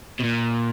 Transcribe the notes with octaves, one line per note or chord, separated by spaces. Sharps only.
B2
A#2